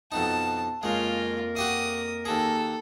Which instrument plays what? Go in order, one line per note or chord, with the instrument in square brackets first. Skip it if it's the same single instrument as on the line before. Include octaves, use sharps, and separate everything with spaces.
[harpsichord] F2 B2 D#4 [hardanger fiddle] A5
[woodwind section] F2 A#3 A#4 [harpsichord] C#3 G#3 [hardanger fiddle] F4
[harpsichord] F#4 G4 F5 [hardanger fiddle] D#6
[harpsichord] D#2 G#4 [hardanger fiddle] A4